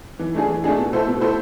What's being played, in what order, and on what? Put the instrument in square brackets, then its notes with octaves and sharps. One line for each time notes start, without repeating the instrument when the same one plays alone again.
[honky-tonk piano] E3
A3 D4 G#4
E3
A3 D4 G#4
B2
A3 E4 A4 C5
B2
A3 E4 A4 C5